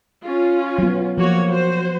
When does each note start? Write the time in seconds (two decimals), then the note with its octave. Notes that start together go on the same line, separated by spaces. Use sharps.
0.24 C#4 F4
0.78 F#3 B3
1.18 F3 A#3 F#4 C#5
1.49 F#4 C5